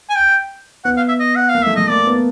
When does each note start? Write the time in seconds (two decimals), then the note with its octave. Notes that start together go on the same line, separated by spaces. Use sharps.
0.10 G#5
0.15 G5
0.85 B3 F#5
0.97 F5
1.08 E5
1.20 D#5
1.36 F#5
1.49 F5
1.55 A#3
1.63 A3 E5
1.76 A3 D#5
1.90 A#3 D5
2.07 B3